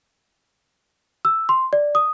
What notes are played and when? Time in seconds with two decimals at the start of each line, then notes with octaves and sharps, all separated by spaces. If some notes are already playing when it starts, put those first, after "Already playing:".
1.25 E6
1.49 C6
1.73 D5
1.95 D#6